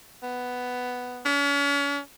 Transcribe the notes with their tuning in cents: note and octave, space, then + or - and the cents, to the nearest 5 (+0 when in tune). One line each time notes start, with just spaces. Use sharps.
B3 +5
C#4 +40